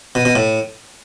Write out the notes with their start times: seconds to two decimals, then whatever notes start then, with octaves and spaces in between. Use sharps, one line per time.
0.15 B2
0.25 B2
0.35 A2